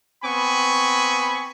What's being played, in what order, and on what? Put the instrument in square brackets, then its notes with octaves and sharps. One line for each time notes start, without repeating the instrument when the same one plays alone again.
[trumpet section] B3 C4 G#5 B5 C#6